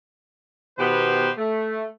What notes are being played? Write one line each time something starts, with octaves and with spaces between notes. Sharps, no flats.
B2 D#3 B3 G4 B4 C5
A3